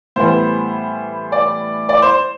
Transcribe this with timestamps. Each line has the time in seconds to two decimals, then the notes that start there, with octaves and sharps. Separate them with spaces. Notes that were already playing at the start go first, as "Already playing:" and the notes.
0.16 A2 E3 G3 B3 C5
1.32 D5
1.89 D5
2.02 C5